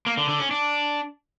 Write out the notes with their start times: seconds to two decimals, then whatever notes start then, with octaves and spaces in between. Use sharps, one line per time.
0.06 A#3
0.18 D3
0.29 D3
0.40 C#4
0.51 D4